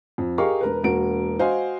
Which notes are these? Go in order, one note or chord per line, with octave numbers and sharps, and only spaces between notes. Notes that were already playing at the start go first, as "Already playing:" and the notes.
F2
G4 G#4 A#4 D#5 F5 C#6
E1 A#4 B4
E1 A#3 F#4 D7
F#4 C5 D#5 F5 F#5 G#5